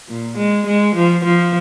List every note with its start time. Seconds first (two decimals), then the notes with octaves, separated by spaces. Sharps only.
0.09 A#2
0.37 G#3
0.66 G#3
0.95 F3
1.24 F3